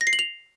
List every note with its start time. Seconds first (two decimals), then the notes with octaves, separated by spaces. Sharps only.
0.01 A#6
0.07 C7
0.13 F#7
0.19 F7